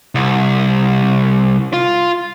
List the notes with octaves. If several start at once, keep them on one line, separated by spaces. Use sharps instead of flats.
C2
F4